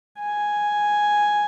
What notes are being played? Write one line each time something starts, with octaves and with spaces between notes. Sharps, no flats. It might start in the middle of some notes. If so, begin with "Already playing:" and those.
G#5